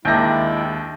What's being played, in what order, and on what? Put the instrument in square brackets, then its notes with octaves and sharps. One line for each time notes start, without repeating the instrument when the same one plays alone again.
[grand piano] D#2 A#4 A#6 [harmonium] G#3 E4 [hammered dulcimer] D4 E5 G5